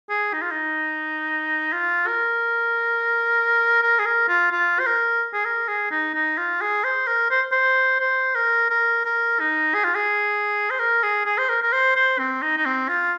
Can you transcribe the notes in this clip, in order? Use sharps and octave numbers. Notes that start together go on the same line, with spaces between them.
G#4
D#4
F4
D#4
F4
A#4
A#4
G#4
A#4
F4
F4
C5
A#4
G#4
A#4
G#4
D#4
D#4
F4
G#4
C5
A#4
C5
C5
C5
A#4
A#4
A#4
D#4
G#4
F4
G#4
C5
A#4
G#4
G#4
C5
A#4
A#4
C5
C5
C4
D#4
D#4
C4
F4